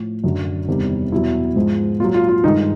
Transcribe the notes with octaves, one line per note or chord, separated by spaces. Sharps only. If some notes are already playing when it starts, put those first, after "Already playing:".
Already playing: A2 F3
F#2 D3 F#3
E2 C3 D#3 G3
E2 B2 F#3 E4
G#2 F3 G#3
A#2 F#3 F4
F4
F4
G2 D#3 G#3 D#4